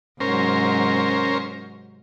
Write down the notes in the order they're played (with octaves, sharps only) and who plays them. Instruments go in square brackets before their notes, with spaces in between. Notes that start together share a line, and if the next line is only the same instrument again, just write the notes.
[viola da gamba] G#2 C3 F#3 [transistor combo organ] C#4 A#4 C5